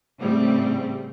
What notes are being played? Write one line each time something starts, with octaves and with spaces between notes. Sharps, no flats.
A2 C#3 G3 C4